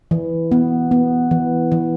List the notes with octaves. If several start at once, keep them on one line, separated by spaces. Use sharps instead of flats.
E3
B3
B3
E3
E3